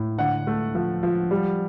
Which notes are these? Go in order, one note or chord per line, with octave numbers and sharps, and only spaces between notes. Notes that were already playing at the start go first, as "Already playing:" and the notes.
Already playing: A2
D3 F#5
A3
F3
F3
G3